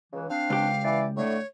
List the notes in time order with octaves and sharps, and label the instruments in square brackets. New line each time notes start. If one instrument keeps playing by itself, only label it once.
[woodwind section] C#2 C#3 E3
[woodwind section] C4 D4 [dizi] F5
[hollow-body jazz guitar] C#2 G4
[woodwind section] E3 D5
[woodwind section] A2 D3 A3 [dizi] C#5